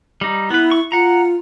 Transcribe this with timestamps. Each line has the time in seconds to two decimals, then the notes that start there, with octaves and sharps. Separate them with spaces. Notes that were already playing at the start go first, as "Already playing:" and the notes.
0.21 G3 D#4
0.51 B3 E4 B4
0.72 C#6
0.92 F4 F#5 A#5